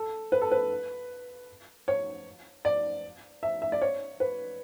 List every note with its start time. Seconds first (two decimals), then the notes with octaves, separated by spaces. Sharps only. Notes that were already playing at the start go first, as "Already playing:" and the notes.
Already playing: A4
0.32 B4
0.41 A4
0.51 B4
1.88 C#5
2.65 D5
3.43 E5
3.62 E5
3.72 D5
3.82 C#5
4.20 B4